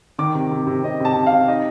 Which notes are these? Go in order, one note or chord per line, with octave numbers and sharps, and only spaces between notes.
D#3 D6
C3
C3
C3
C3 D#5
C3 A5
C3
F5
C3
D#4 D#5